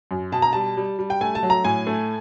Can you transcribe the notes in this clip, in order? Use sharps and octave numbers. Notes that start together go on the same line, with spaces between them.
F#2
B2 A5
A#5
G3 A5
G3
G3
G5
A3 G#5
A5
F#3
A#5
A2 G#5
A3